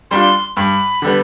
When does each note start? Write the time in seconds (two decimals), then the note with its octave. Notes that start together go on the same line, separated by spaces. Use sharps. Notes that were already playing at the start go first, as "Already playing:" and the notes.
0.11 G3 D4 F4 C6
0.56 G2 B5
1.02 D3 G3 B3